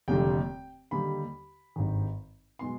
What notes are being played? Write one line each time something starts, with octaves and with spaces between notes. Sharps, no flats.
F1 D#2 D3 G3 G5
D#2 D3 G3 B5
G#1 G2 D#3
B2 G#3 C6